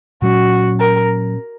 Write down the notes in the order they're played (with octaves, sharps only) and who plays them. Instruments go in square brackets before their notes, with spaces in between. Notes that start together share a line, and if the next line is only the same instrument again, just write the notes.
[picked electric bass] A#2 F#3 C#4 [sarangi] F#4
[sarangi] A#4